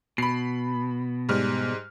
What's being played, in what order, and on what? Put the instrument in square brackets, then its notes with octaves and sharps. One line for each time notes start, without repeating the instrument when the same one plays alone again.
[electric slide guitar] B2 [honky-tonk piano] B5 C7
[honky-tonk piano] G#2 G3 F6